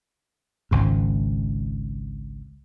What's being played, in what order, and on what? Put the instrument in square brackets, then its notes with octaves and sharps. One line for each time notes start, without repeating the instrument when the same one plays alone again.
[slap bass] G#1 C#2 G#2